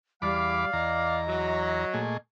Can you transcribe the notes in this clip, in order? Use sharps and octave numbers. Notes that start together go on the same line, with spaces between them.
E2 G3 D5 F5 B5 D6
E2 D#5 A#5
F#3
A#2 A3 G#4